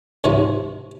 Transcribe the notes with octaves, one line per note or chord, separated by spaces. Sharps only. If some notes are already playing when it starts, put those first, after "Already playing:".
C#2 G#2 C3 F3 C#4